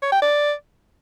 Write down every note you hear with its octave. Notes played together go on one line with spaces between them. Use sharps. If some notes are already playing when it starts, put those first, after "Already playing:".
C#5
G5
D5